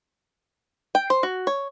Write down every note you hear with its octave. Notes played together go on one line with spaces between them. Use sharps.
G5
C5
F#4
C#5